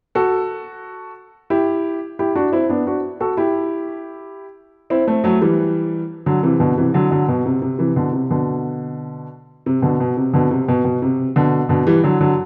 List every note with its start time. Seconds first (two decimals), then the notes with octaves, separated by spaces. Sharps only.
0.15 F#4 A4
1.50 E4 G4
2.19 E4 G4
2.35 D4 F#4
2.52 C4 E4
2.69 B3 D4
2.87 D4 F#4
3.20 F#4 A4
3.37 E4 G4
4.90 C4 E4
5.07 A3 C4
5.24 F#3 A3
5.41 E3 G3
6.26 D3 F#3
6.43 C3 E3
6.60 B2 D3
6.77 C3 E3
6.94 D3 F#3
7.11 D3 F#3
7.28 B2
7.46 C3
7.62 C3
7.79 C3 E3
7.96 B2 D3
8.13 C3
8.31 B2 D3
9.66 C3
9.82 B2 D3
10.00 B2
10.17 C3
10.33 B2 D3
10.51 C3
10.68 B2
10.85 B2
11.02 C3
11.36 B2 D3
11.69 B2 D3
11.87 E3 G3
12.04 D3 F#3
12.20 D3 F#3